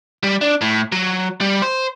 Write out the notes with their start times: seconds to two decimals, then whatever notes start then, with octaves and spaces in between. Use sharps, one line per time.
0.23 G3
0.41 D4
0.61 A2
0.92 F#3
1.41 G3
1.62 C5